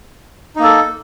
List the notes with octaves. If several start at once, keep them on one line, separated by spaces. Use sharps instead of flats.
A#3 D#4 A4